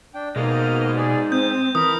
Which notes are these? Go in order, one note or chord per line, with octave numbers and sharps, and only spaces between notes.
D4 G5
B2 G#3 A#3 D#4 D#5 F6
G#4 D5
C4 D#6 G6
E3 A#4 B4 D#6 F6